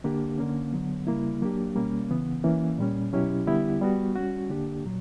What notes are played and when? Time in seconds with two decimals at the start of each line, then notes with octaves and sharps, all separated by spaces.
0.04 D3 A#3 D4 G4
0.38 D3 A#3 C#4
0.73 D3 F#3 B3
1.07 C#3 G3 A#3 E4
1.42 F#3 A#3 D4 G4
1.76 B2 G3 A#3 C#4
2.09 C#3 E3 B3
2.44 E3 A#3 C#4
2.78 A#2 G3 C#4
3.13 B2 F#3 C#4 E4 G4
3.47 D3 G3 B3 E4 G4
3.81 G3 B3 F#4
4.16 G3 C#4 F#4
4.49 D3 A#3 D4 G4
4.84 A#2 F#3